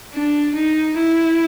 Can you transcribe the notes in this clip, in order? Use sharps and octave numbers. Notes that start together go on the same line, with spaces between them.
D4
D#4
E4